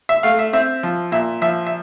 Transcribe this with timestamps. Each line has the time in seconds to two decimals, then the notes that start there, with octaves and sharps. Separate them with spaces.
0.09 E5
0.23 A3 F5
0.39 E5
0.53 C4 E5
0.83 F3
1.12 A#2 E5
1.42 F3 E5
1.67 E5